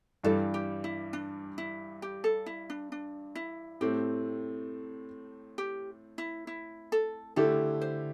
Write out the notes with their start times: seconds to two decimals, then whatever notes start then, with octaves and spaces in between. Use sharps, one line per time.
0.24 G2 E3 G3 A4
0.54 G4
0.84 E4
1.13 D4
1.58 E4
2.02 G4
2.24 A4
2.46 E4
2.70 D4
2.92 D4
3.35 E4
3.81 A2 A3 C4 G4
5.58 G4
6.18 E4
6.47 E4
6.92 A4
7.36 D3 A3 E4 G4 A4
7.81 C5